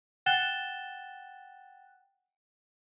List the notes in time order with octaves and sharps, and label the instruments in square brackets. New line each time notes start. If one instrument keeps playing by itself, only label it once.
[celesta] F#5 G5 F#6 A6 E7 G7